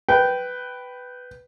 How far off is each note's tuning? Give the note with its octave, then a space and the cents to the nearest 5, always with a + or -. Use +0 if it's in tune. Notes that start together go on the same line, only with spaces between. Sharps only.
B4 +5 G5 -10